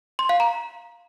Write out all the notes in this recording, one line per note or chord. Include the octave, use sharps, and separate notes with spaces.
C6
F5
A#5